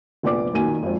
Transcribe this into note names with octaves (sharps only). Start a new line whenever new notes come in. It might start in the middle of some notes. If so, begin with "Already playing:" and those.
F1 A#1 B3 D5 D6
B1 A#2 D#3 G#5 D#7
G#1 F2